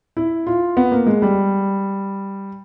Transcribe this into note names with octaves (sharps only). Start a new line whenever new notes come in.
E4
F4
B3
A#3
G#3
G3